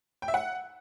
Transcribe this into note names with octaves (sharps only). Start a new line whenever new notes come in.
G5
E5
F#5